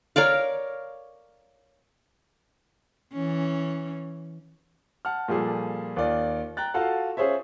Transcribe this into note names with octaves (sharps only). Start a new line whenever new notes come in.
A#4 C#5 D5 F5
E3 C#4
F#5 A5 F6
A#2 F3 G3 G#4 A4
D#2 F4 D5
G5 A#5 F#6 A6
F4 F#4 A4 F5 F#5
C#4 F4 G#4 C5 C#5 E5